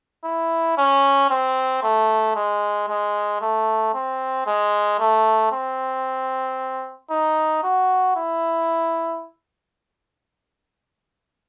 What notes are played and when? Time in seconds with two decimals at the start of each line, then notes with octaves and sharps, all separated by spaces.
0.24 E4
0.78 C#4
1.30 C4
1.83 A3
2.36 G#3
2.89 G#3
3.42 A3
3.94 C4
4.47 G#3
4.99 A3
5.52 C4
7.11 D#4
7.64 F#4
8.16 E4